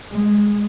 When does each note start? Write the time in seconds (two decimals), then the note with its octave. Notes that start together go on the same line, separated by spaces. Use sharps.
0.11 G#3